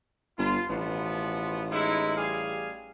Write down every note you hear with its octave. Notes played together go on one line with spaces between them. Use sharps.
G1 F4
A1 B2 F3 B3
G#3 D#4 E4
G3 G#4 F5